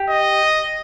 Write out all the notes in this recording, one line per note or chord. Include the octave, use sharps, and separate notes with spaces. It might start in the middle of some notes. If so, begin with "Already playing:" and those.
Already playing: G4
D#5